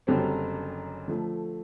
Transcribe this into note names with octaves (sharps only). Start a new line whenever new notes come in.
F#1 F#2 D3 G3 C4
D3 F3 A3